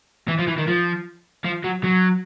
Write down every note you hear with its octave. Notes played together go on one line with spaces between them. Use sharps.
E3
F3
E3
D#3
F3
F3
F#3
F#3